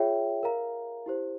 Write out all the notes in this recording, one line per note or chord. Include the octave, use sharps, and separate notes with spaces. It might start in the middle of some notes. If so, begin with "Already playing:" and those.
Already playing: F4 G#4 C#5 E5 G5
A#4 F5 A#5
E4 G4 C5